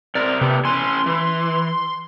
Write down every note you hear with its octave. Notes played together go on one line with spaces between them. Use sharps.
C3 A#4 D5
C3 A3 B3 G4
C#4 E4 G#5 C6
E3